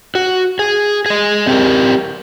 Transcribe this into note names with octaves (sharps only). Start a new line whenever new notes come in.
F#4
G#4
G#4 D#5
C4 G4 A#4